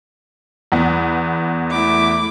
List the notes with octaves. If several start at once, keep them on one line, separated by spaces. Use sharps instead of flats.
E2 B3
A3 E4 D6